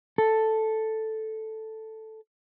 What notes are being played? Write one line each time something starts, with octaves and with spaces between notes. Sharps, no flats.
A4